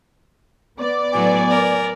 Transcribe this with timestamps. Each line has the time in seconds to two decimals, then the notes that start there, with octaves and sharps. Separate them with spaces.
0.79 B3 D5
1.13 A2 F#3 G#5
1.49 A#4